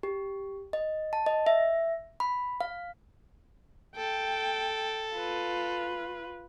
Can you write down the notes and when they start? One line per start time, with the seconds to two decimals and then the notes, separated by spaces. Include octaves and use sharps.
0.03 G4
0.73 D#5
1.13 A5
1.26 D#5
1.46 E5
2.20 B5
2.61 F5
3.96 A4 G5
5.14 F4 B4